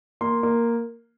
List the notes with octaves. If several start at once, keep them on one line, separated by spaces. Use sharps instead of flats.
A#3 C6
A#3